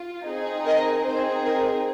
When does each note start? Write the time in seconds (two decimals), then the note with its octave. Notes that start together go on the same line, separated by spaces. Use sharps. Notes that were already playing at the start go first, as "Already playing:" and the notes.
Already playing: F4
0.26 C4 D#4 G#4
0.66 A#4 D#5
1.05 C4 D#4 G#4 C5
1.45 A#4